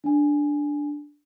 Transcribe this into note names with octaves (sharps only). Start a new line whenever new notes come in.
D4 G#5